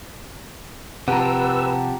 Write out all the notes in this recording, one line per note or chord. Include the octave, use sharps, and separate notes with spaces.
C3 F3 G4 B4 F#5 A5 A#5 E6